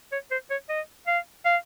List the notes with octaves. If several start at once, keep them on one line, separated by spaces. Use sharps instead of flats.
C#5
C5
C#5
D#5
F5
F5